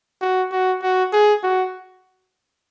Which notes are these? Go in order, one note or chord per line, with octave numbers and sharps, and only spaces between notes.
F#4
F#4
F#4
G#4
F#4